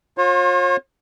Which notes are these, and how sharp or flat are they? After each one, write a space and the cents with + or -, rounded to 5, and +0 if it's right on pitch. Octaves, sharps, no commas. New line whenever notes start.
F4 +35 C#5 -45